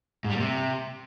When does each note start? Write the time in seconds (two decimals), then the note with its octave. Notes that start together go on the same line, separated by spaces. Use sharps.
0.24 G#2
0.30 G3
0.35 A#2
0.40 C3